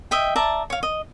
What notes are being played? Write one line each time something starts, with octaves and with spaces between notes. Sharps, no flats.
D#5 E5 G5
D5 E5 A5 A#5
C#5 F5
D#5